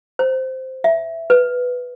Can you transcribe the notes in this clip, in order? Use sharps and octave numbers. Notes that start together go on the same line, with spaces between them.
C5
E5
B4